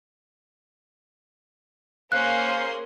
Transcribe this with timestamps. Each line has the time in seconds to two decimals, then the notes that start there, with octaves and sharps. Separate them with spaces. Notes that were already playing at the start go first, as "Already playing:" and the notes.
2.12 A#3 C#4 G#4 C5 F5 C6 F#6